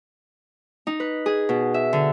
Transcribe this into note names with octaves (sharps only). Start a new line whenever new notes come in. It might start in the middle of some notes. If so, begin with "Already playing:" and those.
D#4
B4
G#4
B2
E5
D3